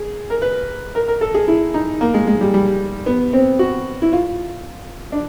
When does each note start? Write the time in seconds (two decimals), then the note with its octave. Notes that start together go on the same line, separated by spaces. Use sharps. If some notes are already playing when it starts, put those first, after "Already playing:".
Already playing: G#4
0.30 A#4
0.42 B4
0.95 A#4
1.08 A#4
1.21 A4
1.34 G#4
1.48 E4
1.74 D#4
2.01 A#3
2.14 G#3
2.27 G#3
2.41 G3
2.54 G3
3.06 B3
3.33 C4
3.59 F#4
4.02 E4
4.13 F4
5.12 D4